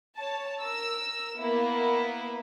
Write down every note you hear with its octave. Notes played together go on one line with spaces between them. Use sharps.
C#5 A5
A#4 E6
A#3 B3 E4